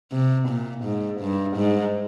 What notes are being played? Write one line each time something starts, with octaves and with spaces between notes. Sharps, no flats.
C3
A#2
G#2
G2
G#2